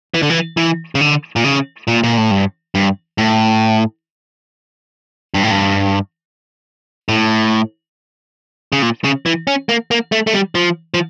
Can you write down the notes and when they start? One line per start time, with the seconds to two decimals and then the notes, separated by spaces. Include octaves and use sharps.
0.14 E3
0.23 D3
0.30 E3
0.57 E3
0.95 C#3
1.01 D3
1.36 A#2
1.44 C#3
1.87 A#2
2.03 A#2
2.18 A2
2.31 G2
2.75 G2
3.18 A2
5.34 G2
5.43 A2
5.51 G2
7.08 A2
8.72 C#3
8.82 A#2
9.04 C#3
9.26 E3
9.47 C#4
9.69 A#3
9.91 A#3
10.12 A3
10.27 A3
10.33 G3
10.55 F3
10.94 F3